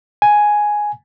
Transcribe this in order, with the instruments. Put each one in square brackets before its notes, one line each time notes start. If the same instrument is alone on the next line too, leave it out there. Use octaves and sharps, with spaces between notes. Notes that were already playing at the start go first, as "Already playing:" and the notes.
[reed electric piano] G#5